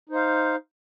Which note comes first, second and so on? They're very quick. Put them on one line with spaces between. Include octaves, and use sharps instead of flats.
D#4 C5 F5